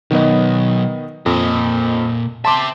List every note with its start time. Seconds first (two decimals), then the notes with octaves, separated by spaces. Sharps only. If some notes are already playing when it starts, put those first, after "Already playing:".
0.11 B1 D#3 B3 D#5
1.26 F2 A#2 D#5
2.45 C5 E5 A5 C6 D6